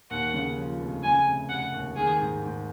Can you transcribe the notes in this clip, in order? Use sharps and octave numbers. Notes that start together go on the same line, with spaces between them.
D#2 F#5
C#3
F3
F1
C#3 G#5
F1
F1 F#5
D#2
D#3 G#4
G#2
G#2